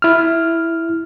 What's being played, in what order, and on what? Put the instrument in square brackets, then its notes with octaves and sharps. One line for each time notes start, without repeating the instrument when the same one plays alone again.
[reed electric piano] E4 F6